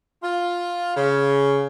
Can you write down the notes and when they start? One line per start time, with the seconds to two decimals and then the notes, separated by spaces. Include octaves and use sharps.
0.23 F4
0.96 C#3